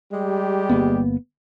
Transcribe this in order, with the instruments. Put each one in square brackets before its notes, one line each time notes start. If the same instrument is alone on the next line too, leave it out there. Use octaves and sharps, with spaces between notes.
[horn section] G3 G#3 G4
[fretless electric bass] G1 A#3 B3